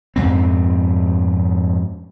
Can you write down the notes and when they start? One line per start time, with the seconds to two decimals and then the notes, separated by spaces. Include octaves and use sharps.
0.16 F2 G#2 C4